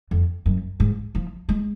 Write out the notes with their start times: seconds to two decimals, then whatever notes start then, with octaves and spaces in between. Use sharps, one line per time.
0.11 F2
0.46 F#2
0.80 G#2
1.15 F3
1.49 G#3